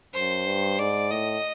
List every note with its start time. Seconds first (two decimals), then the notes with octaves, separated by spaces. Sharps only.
0.14 F#2 C5
0.46 G2
0.79 G#2 D5
1.11 A2 D#5